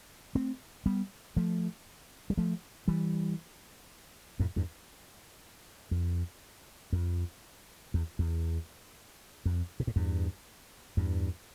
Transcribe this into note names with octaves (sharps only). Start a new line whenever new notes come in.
A3 C4
G3 B3
F3 A3
G3
F3 A3
E3 G3
F2 A2
E2 G2
F2
F2
E2
E2
F2
B2
A2
E2 G2
E2 G2